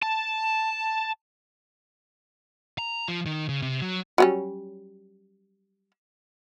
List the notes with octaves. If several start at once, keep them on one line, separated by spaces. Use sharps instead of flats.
A5
A#5
F3
D#3
C#3
C3
F#3
F#3 G3 C#4